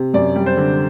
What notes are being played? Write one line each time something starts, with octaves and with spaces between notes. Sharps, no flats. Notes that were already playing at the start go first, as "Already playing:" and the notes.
Already playing: C3
F#2 D5
G3
C5
D3